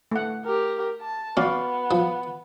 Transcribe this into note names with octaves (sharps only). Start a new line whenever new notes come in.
A3 F#5
G4 A#4
A5
B3 C#4 F#4 D5 F5
F3